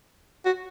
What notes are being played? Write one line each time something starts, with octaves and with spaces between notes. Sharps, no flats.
F#4